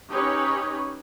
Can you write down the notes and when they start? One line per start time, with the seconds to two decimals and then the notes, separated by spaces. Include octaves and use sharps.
0.11 C#4 D#4 G4 B4 C#5